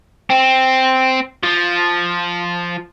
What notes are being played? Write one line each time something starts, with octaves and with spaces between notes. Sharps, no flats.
C4
F3